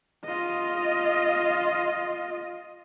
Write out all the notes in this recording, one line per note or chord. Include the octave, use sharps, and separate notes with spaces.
F4 D#5